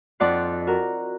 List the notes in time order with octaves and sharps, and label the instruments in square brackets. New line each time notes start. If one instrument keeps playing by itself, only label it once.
[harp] F2 D#4 D5 F#5 C6
F#4 A#4